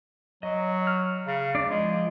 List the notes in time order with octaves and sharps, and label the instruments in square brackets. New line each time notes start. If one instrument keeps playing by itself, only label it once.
[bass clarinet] F#3 [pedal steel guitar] D#5
[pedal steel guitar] F6
[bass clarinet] C#3
[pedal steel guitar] D4 D5
[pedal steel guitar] F3 [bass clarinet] G#3